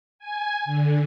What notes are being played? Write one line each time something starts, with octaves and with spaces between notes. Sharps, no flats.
G#5
D3